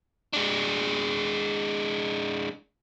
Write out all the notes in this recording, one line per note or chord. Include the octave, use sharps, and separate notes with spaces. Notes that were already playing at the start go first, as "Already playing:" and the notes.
G#3 D4